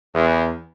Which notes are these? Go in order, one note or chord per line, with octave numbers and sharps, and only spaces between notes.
E2